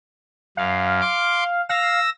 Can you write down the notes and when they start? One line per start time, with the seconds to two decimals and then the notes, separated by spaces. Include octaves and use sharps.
0.57 F#2 F5
1.01 C6 D6
1.69 F5 E6 A#6